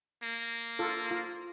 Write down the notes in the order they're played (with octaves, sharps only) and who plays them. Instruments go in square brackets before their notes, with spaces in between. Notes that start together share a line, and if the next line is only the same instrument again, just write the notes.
[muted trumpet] A#3
[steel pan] F4 A4
F4